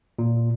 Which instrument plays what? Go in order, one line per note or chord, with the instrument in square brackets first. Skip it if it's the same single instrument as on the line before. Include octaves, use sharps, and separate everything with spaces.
[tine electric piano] A#2